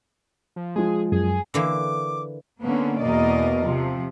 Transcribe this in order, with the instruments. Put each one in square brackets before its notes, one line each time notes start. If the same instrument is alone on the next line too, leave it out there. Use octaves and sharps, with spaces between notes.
[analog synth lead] F3
[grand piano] F3 G#3 [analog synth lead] G#4
[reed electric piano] F#2 [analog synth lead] G#4
[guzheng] D3 E3 A#3 [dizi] D6
[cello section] D3 A#3 B3 C#4
E2 B2 A#3 A#4 D5 D#5
C3 F3